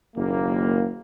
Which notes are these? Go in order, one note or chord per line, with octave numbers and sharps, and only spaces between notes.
F#1 D#2 A#3